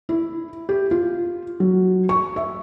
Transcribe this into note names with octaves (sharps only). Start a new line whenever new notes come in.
E4
G4
F4
F#3
C#6
E5